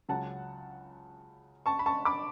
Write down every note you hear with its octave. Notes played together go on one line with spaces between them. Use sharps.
C#2 C#3 F#3 F#5 A5
A5 C#6
B5
A5 C#6
B5 D6